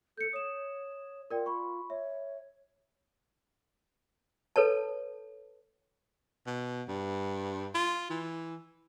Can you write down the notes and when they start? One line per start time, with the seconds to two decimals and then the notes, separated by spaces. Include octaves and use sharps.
0.17 A4 G6 C#7
0.33 C#5 D#6 E7
1.31 F4 A#4 D5 G5
1.46 B5 C#6
1.90 C#5 E5
4.56 A4 B4 C#5 A5
6.47 B2
6.88 G2
7.75 F4
8.10 E3